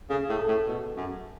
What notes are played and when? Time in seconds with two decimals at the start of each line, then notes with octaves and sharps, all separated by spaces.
0.10 C#3 G#4
0.29 A2
0.39 A4
0.48 A2
0.67 B2
0.96 F#2